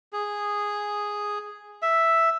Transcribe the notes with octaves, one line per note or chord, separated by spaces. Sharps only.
G#4
E5